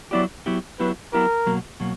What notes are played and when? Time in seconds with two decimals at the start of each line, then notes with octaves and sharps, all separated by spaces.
0.11 F#3 B3 E4 G4 D5
0.46 F#3 B3 E4 G4
0.79 F#3 B3 E4 G4 B4
1.13 F#3 B3 E4 G4 A#4
1.46 B2 F#3 A#3
1.80 B2 F#3 A#3